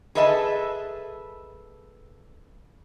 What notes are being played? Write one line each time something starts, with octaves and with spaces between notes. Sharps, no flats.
G#4 A4 B4 D#5 E5 A5